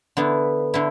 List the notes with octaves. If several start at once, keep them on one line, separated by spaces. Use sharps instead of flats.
D3 B3 E4
D3 E4